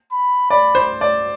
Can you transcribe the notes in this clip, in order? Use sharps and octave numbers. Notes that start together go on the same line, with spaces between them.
B5
D5 B5
C5
D5